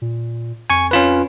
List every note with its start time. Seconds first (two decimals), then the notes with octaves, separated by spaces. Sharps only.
0.02 A#2
0.70 F2 G#5 C#6
0.91 C#4 F4 B4